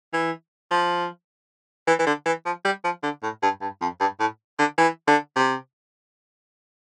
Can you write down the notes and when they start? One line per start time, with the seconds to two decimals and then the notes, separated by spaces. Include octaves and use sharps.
0.13 E3
0.71 F3
1.87 E3
1.99 E3
2.06 D3
2.26 E3
2.45 F3
2.65 G3
2.84 F3
3.03 D3
3.23 A2
3.43 G2
3.61 G2
3.82 F2
4.00 G2
4.20 A2
4.59 D3
4.78 E3
5.07 D3
5.36 C3